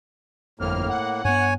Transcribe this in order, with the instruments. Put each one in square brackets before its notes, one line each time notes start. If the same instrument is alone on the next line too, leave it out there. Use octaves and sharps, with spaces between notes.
[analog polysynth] G1 F2 F6 [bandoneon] A2 A#3
[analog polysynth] F#5
[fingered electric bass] G2 B3 [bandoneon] C#5 G#5